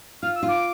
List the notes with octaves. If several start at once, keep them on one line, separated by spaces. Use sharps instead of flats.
F4 F6
E6
F4
D6